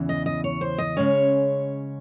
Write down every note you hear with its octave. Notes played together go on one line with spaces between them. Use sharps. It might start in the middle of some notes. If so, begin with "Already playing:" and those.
Already playing: E2 C#3 E3
D#5
D#5
C#5
C5
D#5
C#3 G#3 C#4 C#5